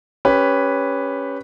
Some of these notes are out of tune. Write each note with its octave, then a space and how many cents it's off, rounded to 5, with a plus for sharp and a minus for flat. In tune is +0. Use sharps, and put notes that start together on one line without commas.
C#4 +0 G4 +20 B4 +0